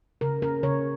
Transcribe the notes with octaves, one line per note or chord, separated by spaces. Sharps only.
C#3 A#4
C#4 A#4
C#3 C#5